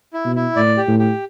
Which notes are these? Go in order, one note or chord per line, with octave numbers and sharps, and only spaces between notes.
E4
B2
E4
A2 D5
G4
A2
G4